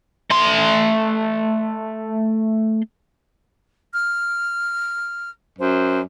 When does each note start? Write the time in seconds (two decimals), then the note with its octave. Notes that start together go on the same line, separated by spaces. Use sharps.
0.30 A3 C6
3.93 F6
5.59 F#2 C5